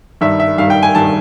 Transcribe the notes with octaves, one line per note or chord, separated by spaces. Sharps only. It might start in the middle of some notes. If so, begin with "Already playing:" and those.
G2 D#3 G3 E5
E5
G2 D#3 G3 F5
G5
G#5
G2 D#3 G3 A5